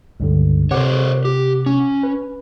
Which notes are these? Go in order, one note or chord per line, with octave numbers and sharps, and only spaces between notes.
C#2 G2 D3
C3 A#4 C5 C#5 F#5 D6
G4
C#4
B4